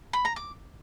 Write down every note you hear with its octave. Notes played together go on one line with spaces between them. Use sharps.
B5
A#5
D6